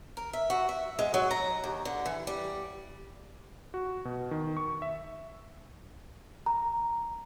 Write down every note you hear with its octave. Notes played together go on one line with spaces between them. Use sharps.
A#4
E5
F#4
E5
G#3
F#3
A#5
D#2
D3
E3
G3
F#4
B2
D#3
C#6
E5
A#5